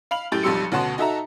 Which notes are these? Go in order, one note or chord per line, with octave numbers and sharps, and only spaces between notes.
F5 B5 F7 F#7
F#2 A2 G4 G5 A6
B1 F2 G3 C6 E6 C#7
D2 B2 C#4 F#5 A5 C6
D#4 F#4 A4 E5 A5 A#5